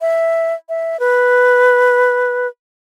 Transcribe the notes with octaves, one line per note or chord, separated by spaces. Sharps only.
E5
E5
B4